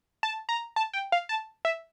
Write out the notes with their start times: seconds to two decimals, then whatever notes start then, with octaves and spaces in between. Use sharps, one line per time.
0.23 A5
0.49 A#5
0.76 A5
0.93 G5
1.12 F5
1.29 A5
1.65 E5